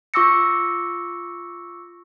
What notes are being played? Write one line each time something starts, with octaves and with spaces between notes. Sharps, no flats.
F4 C#6 D6 E6 A#6 C#7